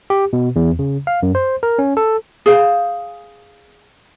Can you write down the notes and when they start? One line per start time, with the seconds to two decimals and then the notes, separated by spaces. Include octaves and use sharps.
0.10 G4
0.33 B2
0.56 E2
0.79 C#3
1.07 F5
1.23 F#2
1.35 C5
1.63 A#4
1.79 C#4
1.97 A4
2.46 G#4 C5 F5